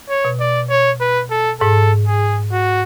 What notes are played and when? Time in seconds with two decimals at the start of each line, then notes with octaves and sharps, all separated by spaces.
0.09 C#5
0.25 B2
0.40 D5
0.70 C#5
1.01 B4
1.31 A4
1.60 G#2 A4
2.07 G#4
2.52 F#4